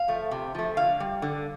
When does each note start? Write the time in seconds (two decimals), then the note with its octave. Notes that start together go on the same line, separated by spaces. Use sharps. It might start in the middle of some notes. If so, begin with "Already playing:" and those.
Already playing: F5
0.08 F3 A3
0.31 C3
0.55 F3 A3
0.77 D3 F5
1.00 G3
1.22 D3